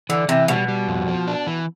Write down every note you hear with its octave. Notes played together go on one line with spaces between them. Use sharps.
D3 E3
C3 E3
B2 G3
G3
F2
F3
D4
E3